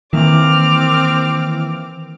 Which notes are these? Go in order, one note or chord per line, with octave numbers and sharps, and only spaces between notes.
D#3 E3 A#3 C4 D6 F6